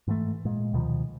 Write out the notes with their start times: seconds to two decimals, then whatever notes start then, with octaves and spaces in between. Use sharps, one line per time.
0.07 G#2 E3 F3 A3
0.45 A#2 G#3
0.73 D2 B2 D#3 F3